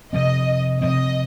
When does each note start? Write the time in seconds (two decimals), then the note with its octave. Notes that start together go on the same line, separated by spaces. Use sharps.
0.13 C3 F3 C4 D#5
0.82 C3 F3 C4 D#5